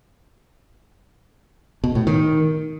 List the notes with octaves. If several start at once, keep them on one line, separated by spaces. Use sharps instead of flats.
B2
A2
D#3